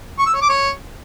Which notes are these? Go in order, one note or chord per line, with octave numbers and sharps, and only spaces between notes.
C#6
E6
C#5
D6
C#5